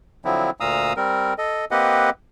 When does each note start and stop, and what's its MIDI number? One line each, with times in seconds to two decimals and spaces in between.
0.25 0.50 50
0.25 0.50 53
0.25 0.50 54
0.25 0.50 60
0.25 0.50 64
0.60 0.93 38
0.60 0.93 46
0.60 0.93 77
0.60 0.93 82
0.60 0.93 87
0.60 0.93 88
0.97 1.34 55
0.97 1.34 60
0.97 1.34 70
1.38 1.65 69
1.38 1.65 75
1.71 2.10 58
1.71 2.10 60
1.71 2.10 67
1.71 2.10 71
1.71 2.10 75
1.71 2.10 78